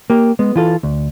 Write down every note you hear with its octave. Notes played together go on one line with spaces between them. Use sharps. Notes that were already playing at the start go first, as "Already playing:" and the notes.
A#3 G4
G#3 B3
E3 F4 A4
D2